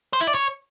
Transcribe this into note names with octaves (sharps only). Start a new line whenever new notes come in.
C5
E4
D5
C#5